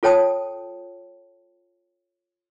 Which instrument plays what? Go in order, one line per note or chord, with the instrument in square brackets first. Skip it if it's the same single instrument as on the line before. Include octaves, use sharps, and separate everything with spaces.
[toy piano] F4 A4 C#5 G5 A5 D#6